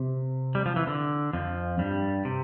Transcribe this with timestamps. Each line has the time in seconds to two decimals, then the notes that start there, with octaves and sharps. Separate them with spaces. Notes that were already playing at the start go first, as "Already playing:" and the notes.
Already playing: C3
0.55 G3
0.66 F3
0.76 E3
0.87 D3
1.33 F2 F3
1.79 G2 G3
2.25 C3